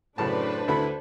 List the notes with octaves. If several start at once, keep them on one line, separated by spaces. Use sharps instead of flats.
F#2 A2 C#3 D4 B4 C5 A5
D2 E4 A4 B5